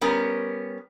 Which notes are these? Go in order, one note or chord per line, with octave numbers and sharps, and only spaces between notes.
G3 B3 C#4 A#4